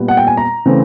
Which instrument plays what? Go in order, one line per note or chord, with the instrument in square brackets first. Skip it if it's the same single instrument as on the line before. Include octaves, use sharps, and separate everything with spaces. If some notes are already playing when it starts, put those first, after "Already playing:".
Already playing: [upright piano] A#2 G3 B3
F#5
G5
G#5
A#5
C#3 E3 A3 C4